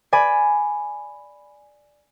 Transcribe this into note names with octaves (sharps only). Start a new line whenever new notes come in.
D5 G#5 B5